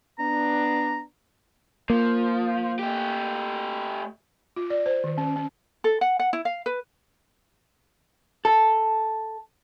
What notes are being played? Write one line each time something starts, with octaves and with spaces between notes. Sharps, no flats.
B3 D4 A#5
F3 A#3
A3 G4
F4
D5
C5
D#3
C#4
C#4
A4
F#5
F#5
E4
F5
B4
A4